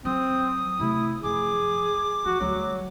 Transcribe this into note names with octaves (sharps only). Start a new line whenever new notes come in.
F#3 C4 D#6
C3 A3 E4
F#2 F3 G#4 D6
F3 F#4
D2 F#3 G3